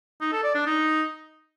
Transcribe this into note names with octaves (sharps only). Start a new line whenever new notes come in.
D#4
A4
D5
D4
D#4